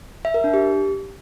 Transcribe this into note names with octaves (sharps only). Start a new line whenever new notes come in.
E5
A#4
D4
G4